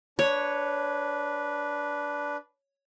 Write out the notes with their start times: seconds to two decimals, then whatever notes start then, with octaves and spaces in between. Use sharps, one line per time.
0.19 D4 B4 C#5